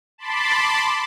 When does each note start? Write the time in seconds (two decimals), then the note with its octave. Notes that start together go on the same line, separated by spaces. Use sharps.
0.18 A5 B5 C6 D6